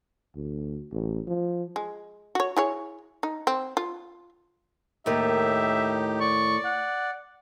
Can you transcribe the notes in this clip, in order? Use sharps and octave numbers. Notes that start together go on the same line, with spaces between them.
D2
A1
F3
G#3
F#4 C#5
E4 G#4 C#5
D#4
C4
F4
D#2 A2 D#4 G4 A#4 E5
D5 C#6
F#5